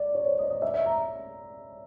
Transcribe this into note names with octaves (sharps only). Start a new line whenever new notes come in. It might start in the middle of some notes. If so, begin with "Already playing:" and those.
Already playing: D5
C#5
C5
D#5
D#5
E5
E5
A#5